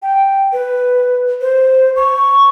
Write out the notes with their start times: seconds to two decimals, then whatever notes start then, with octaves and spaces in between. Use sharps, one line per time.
0.02 G5
0.53 B4
1.41 C5
1.96 C#6